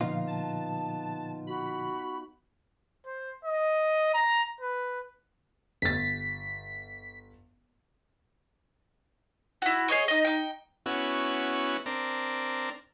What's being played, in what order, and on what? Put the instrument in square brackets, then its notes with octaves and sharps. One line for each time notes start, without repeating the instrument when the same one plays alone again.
[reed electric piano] A#2 D3 F3 [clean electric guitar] B3 D#4 F4 [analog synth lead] F5
[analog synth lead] A5
[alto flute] F#4 [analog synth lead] B5
[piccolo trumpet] C5
D#5
A#5
B4
[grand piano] G1 A6 [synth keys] B6
[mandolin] E4 F#4
G#4 C#5 D#5 C#6
D#4 D#5
D#4 G5
[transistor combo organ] B3 C#4 E4 F#4
C4 D4 A#4